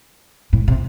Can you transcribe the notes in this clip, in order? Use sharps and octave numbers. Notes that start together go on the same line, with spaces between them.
A2
C3